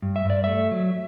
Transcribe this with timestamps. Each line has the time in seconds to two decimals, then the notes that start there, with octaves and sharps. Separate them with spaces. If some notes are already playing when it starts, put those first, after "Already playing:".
0.02 G2
0.16 E5
0.25 G2 D5
0.44 A3 E5
0.71 F#3